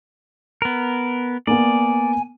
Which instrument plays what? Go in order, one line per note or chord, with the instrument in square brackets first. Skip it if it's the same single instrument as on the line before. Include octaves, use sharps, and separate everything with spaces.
[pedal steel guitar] B3 A#4
[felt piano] A#3 B3 [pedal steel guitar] D5 [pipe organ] G#5